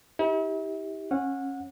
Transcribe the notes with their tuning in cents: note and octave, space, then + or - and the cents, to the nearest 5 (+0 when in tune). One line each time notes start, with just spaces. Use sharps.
E4 -45 G4 +5
C#4 -20 F#5 -25